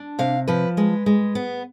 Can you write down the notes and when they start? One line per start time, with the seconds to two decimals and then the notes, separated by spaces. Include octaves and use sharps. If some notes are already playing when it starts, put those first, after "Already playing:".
Already playing: D4
0.19 C3 F5
0.48 F3 B4
0.77 G#3 B4
1.06 G#3
1.35 B3